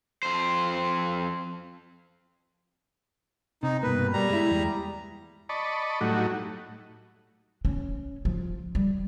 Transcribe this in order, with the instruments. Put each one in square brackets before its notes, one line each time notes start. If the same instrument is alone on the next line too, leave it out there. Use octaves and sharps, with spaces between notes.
[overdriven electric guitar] F2 C5
[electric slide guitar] C3 [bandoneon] D#4
[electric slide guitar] G2 B2 A#3 [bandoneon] B4
[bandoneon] G3 A#5
[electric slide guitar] G#3 E4
E2 G#3
[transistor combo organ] D5 D#5 A5 B5 C#6
A2 F#3 G3 A3 D#4 F#4
[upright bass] C#4
F3
G3